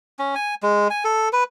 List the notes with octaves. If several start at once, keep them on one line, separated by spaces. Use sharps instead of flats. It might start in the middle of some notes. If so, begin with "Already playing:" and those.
C#4
G#5
G#3
G#5
A4
B4